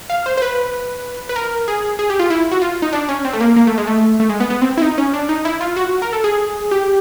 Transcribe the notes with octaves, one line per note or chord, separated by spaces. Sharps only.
F5
C5
C5
B4
B4
A#4
G#4
G#4
G4
F4
E4
F#4
F4
D#4
D4
C#4
C4
A3
A#3
A#3
A3
G#3
A3
A3
G#3
B3
B3
C4
E4
D#4
C#4
D4
D#4
E4
F4
F#4
A#4
A4
G#4
G4